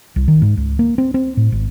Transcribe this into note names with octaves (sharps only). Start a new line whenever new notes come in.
C2
D#3
G#2
C#2
A#3
C4
C4
A2
G#1